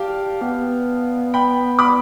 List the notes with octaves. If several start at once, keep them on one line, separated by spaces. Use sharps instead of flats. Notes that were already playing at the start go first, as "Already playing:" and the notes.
Already playing: G4 F5 G5 A5
B3
G5 B5
B5 D6